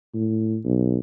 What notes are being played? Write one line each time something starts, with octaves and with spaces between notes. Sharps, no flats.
A2
B1